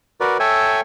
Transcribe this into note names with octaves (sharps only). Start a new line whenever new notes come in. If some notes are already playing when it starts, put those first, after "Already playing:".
F#4 A#4 B4 D5
A4 C#5 E5 G5 G#5